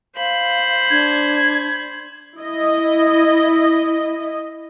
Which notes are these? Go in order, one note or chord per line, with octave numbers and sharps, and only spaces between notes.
C5 F5 B5
D4 G#6
E4 D#5